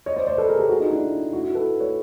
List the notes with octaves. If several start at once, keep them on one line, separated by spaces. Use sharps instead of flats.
C#5 D#5
C5 D5
C5 D5
A4 B4
G#4 A#4
G4 A4
F#4 G#4
D#4 F4
D4 E4
E4 F#4
E4 F#4
A4 B4
B4 C#5